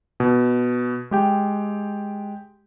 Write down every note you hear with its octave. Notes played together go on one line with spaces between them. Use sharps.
B2
G#3 G4 G5